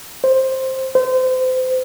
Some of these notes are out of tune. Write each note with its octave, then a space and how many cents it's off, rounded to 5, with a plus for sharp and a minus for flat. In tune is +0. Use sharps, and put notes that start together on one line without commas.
C5 +10
C5 -30